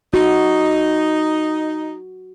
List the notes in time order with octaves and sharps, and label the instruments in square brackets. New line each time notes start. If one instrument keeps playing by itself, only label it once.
[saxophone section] D#4 [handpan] F#4